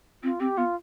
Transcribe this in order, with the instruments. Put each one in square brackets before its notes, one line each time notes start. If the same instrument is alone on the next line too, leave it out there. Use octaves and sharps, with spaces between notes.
[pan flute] C4 [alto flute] F4
[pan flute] C4 [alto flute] G4
[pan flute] B3 [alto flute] F4